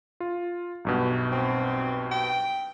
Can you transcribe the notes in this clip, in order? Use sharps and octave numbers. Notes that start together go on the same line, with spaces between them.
F4
B1 G2 B2
C4
G5